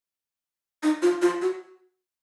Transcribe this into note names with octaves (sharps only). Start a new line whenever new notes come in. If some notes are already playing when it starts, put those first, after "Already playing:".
D#4
F4
F4
F#4